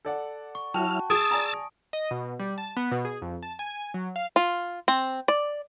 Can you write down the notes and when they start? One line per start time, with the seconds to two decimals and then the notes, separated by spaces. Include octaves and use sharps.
0.05 A4 D5 F#5
0.55 C#6
0.74 F#3 E4 F#4 G5 A5 F6
1.10 G#4 D#6 E6 A6 D7
1.31 D5 G#5 A#5
1.93 D#5
2.11 B2
2.39 G3
2.58 A5
2.77 B3
2.92 B2
3.05 G#4
3.22 F2
3.43 A5
3.59 G#5
3.94 F#3
4.16 F5
4.36 F4
4.88 C4
5.28 D5